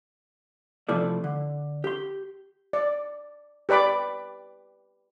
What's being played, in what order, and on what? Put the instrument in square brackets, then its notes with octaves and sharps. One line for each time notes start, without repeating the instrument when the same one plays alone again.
[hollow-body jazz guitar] C3 E3 F3 A3 D5
D3
G4 C6
[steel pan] D5
G4 B4 D5 B5 D6